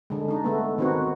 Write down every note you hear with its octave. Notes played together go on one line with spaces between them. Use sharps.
D3 G#3
D4 D#4
G#3 A3 B3
D#3 B3 C4 D#4 F#4